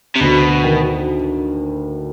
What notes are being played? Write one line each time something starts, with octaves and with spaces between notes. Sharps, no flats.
C3
D2 B2
D#3